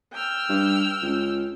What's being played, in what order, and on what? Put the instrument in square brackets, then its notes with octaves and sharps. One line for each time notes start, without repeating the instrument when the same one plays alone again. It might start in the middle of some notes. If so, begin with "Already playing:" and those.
[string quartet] G5 E6 F6
[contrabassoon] G2
C#2